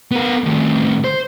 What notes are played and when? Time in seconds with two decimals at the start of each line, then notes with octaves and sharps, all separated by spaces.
0.12 B3 A#4
0.44 A2 D#3
1.04 C5